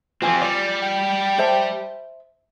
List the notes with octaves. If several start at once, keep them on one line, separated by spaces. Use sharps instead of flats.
F3 C4 F4 G4 G#5
G3 D5
G5
C5 E5 A5